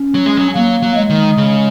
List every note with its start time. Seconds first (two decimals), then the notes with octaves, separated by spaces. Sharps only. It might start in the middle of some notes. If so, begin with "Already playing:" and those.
Already playing: C#4
0.14 F#3
0.26 G#3
0.37 F#3
0.55 F#3 A#3
0.82 F#3
0.96 G#3
1.10 D#3
1.37 C#3